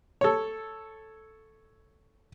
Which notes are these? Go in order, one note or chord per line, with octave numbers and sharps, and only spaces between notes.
A4 C#5